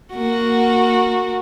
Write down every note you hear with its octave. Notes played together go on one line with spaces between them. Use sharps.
A#3 F#4